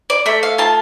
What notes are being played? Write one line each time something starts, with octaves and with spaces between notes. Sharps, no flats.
D5
A3 E5
F5
F4 A5